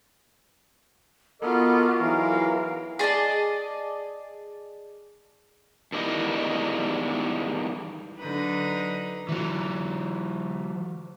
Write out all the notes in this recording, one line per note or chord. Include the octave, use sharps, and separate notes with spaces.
B3 F4 F#4 A4 A#4 D#5 C6 D6
E3 F#3 D#4 F4 G#4 A#4 F5
G#4 D5 D#5 A5
E2 D#3 G3 G#3 E4 D#5
D3 F#3 D4 D#4 B4
E3 F#3